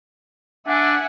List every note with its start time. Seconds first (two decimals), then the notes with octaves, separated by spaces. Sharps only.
0.68 D4 E5 F#5 G#5